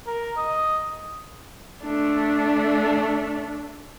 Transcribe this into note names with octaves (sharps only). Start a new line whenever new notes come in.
A#4
D#5
A3 D4